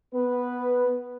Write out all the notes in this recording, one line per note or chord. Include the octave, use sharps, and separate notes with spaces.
B3 B4